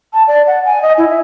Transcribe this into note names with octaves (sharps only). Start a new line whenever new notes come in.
A5
D5
F#5
G#5
D#5
E4
E5